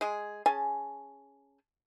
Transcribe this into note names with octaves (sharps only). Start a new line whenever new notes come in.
G#3 G#4
C#4 G#4 G#5 A5